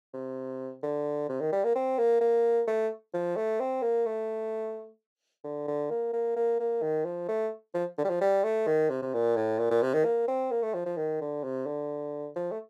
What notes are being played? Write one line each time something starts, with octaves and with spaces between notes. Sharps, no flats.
C3
D3
C3
D#3
G3
A#3
C4
A#3
A#3
A3
F3
A3
C4
A#3
A3
D3
D3
A#3
A#3
A#3
A#3
D#3
F3
A3
F3
D3
G3
F3
G3
A3
D#3
C3
C3
A#2
A2
A#2
A#2
C3
D#3
A#3
C4
A#3
A3
F3
F3
D#3
D3
C3
D3
F3
A3